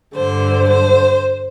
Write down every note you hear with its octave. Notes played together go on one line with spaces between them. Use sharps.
G2 D3 C5
C5